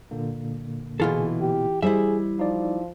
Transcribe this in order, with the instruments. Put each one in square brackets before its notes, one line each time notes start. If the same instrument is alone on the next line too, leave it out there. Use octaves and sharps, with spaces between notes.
[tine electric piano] A#2 D3 A#3
[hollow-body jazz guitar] B2 F4 A4 [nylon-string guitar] E3 [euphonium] G#4
[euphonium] G4
[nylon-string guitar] G3 D#5 [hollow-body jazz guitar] E4 C5 E5 [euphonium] G#4
[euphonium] F3 [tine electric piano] D#4 D5